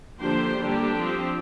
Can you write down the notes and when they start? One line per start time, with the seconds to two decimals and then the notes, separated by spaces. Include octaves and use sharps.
0.20 D3 F3 A#3 D4 G4 C5
0.57 D3 G3 A#3 D4 G4
0.94 F3 C4